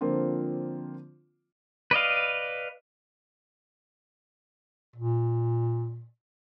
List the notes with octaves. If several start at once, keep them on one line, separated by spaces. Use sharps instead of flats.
D3 F3 A#3 C4 D4 F4
B4 D5 D#5 F5
A#2